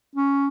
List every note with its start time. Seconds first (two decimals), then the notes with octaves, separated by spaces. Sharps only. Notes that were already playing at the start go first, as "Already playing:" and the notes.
0.16 C#4